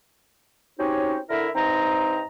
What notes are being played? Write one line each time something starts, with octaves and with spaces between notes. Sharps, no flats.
C4 C#4 D#4 F#4 G4 C#5
D3 E4 A#4 E5
G2 C4 D#4 D#5 A#5